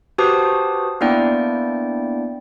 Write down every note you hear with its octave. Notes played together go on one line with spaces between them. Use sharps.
F#4 G4 B4 C5 A5 D#6
A#3 B3 D4 E4 D5 G5